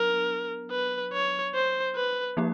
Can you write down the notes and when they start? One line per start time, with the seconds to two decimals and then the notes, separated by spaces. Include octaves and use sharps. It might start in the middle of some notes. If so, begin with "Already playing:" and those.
Already playing: F#3 B3 D4 A#4
0.71 B4
1.13 C#5
1.54 C5
1.95 B4
2.37 F3 A#3 D#4 G4